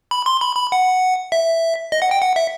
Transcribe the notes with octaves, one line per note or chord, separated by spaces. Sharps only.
B5
C6
B5
B5
F#5
E5
D#5
F#5
G5
F#5
E5